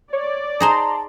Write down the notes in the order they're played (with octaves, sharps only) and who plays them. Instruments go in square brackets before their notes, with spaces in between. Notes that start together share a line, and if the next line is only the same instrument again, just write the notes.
[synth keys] C#5 [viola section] D5
[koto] D#4 G#4 C5 [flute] A5 [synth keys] A#5 C6